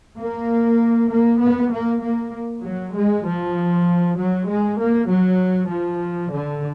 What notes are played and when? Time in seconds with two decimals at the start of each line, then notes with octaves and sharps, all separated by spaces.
0.18 A#3
1.10 A#3
1.41 B3
1.72 A#3
2.02 A#3
2.63 F#3
2.94 G#3
3.25 F3
4.17 F#3
4.47 G#3
4.78 A#3
5.08 F#3
5.70 F3
6.31 D3